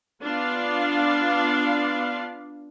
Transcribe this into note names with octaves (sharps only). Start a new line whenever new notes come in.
B3 D4 F4 D5 F5